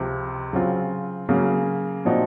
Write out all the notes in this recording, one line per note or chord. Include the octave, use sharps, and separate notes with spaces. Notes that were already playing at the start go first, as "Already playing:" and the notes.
Already playing: C#2 C3 F3
C#3 F#3 C4 F4
C#3 F#3 A#3
A#2 F3 C4 D#4 F#4